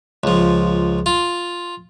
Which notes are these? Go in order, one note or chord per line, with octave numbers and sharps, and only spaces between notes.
C#2 F3
F4